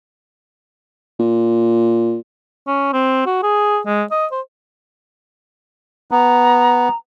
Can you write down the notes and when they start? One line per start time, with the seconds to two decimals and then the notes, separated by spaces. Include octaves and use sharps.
1.20 A#2
2.67 C#4
2.93 C4
3.26 F#4
3.43 G#4
3.86 G#3
4.11 D#5
4.32 C5
6.11 B3 A#5